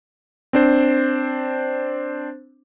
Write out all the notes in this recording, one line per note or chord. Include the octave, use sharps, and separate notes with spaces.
C4 D4 C5